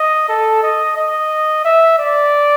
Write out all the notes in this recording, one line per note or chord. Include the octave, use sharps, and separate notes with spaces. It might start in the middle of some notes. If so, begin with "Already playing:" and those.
Already playing: D#5
A4
D#5
D#5
E5
D5